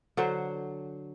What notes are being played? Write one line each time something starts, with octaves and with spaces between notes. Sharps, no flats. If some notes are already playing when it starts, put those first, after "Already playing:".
D3 F#3 C5